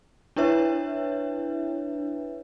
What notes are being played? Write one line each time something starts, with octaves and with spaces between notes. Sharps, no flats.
D4 E4 B4 C#5 E5